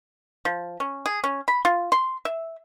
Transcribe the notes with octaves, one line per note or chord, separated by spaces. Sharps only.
F3
C#4
G#4
C#4
B5
F4
C6
E5